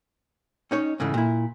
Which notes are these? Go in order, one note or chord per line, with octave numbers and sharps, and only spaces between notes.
C#4 D#4 C#5
G#2 C#3 E3 A3
A#2 E4